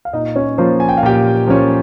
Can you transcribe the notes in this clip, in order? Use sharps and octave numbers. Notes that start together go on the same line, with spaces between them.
F5
A#2 D#4 D#5
C#4 C#5
F3 A#3 C#4 F4 C5
G#5
G5
F5
A#2 G4 G5
F3 A#3 C#4 F4